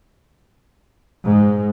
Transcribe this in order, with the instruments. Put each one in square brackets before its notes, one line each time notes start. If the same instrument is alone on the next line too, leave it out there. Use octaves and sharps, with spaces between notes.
[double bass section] G#2